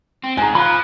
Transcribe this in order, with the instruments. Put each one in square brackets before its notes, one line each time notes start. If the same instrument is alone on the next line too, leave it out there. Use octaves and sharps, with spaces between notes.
[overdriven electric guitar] C4
[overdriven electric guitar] G#2 [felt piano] G#5 A#5
[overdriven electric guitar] F3 [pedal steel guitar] B5 F#6